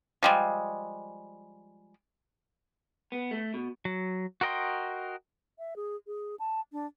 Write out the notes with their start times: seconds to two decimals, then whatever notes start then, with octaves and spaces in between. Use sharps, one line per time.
0.23 F3 G3 G#3
3.12 B3
3.31 A3
3.54 B2
3.85 F#3
4.41 F#4 A#4 D#5 G5 C6
5.59 E5
5.76 G#4
6.07 G#4
6.39 A5
6.72 D4